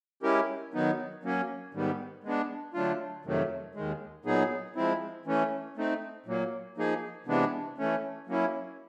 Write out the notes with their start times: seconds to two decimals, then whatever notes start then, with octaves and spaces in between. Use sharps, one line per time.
0.23 G#3 C#4 E4 G4 A#4
0.74 D#3 F#3 B3 D#4
1.23 F#3 A#3 C#4
1.74 G#2 D#3 G3 B3
2.24 G#3 B3 D4
2.74 D3 F#3 A3 D4 F4
3.25 F2 C3 D#3 F#3 A3
3.75 D#2 D#3 G#3
4.25 A#2 F#3 B3 D#4 G#4
4.76 F3 G#3 C4 E4
5.25 E3 A3 C#4
5.77 A3 C4 D#4
6.26 A#2 F#3 A#3
6.77 F3 A#3 D#4 G#4
7.26 C3 E3 G#3 B3 D4
7.78 E3 A3 C#4
8.27 F#3 A#3 C#4 E4